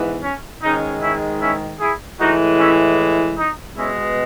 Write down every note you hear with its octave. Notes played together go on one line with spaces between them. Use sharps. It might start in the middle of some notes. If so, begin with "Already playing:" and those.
Already playing: G#2 E3 B3
C#4
G#2 D#3 G#3 C#4 D#4
C#4 E4
C#4 E4
E4 G#4
A2 E3 G#3 D#4 F#4
C#4 E4
D#4
B2 G#3 B3 C#4 E4